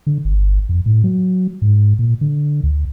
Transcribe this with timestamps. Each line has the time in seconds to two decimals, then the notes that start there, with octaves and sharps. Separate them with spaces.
0.07 D3
0.25 G1
0.69 F2
0.86 A2
1.04 F#3
1.62 G#2
1.99 A#2
2.21 D3
2.63 D2